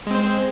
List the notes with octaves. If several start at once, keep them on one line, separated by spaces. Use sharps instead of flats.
G#3 C4 C5